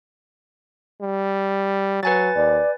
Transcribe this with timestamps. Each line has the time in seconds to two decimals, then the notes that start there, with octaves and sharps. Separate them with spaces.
1.01 G3
2.03 F#3 B4 G#5 A6
2.36 D#2 D5